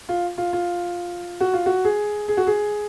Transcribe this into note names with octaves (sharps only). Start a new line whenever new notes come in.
F4
F4
F4
F#4
F4
F#4
G#4
G#4
F#4
G#4